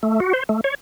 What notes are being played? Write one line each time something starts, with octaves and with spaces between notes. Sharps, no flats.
A3
F#4
C5
A3
C#5